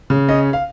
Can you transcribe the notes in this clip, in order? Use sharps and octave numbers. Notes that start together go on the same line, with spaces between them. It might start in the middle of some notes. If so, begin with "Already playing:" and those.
C#3
C#4 D#5
F5